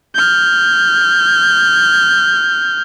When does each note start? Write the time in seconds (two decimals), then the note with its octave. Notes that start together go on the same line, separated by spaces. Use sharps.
0.14 F6 G6